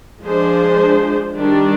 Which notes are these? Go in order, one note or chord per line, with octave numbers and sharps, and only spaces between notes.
F3 G#3 D4 G#4 C5
D#3 G3 D4